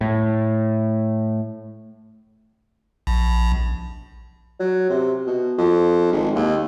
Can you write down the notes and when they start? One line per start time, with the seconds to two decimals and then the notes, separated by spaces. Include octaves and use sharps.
0.01 A2
3.07 A#1
4.59 F#3
4.90 C3
5.27 B2
5.58 F2
6.12 G#1
6.35 D#2